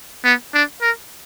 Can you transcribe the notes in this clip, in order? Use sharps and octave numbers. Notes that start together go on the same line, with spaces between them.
B3
D4
A#4